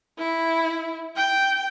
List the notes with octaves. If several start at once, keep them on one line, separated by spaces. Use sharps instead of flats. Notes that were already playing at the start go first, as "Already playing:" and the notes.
E4
G5